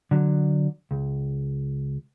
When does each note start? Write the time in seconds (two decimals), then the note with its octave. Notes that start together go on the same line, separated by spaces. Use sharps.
0.11 D3 F#3
0.91 C#2